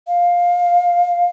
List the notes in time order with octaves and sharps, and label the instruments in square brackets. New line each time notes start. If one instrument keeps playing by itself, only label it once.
[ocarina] F5